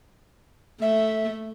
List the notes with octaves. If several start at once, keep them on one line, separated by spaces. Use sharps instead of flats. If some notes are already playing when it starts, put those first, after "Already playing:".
A3 E5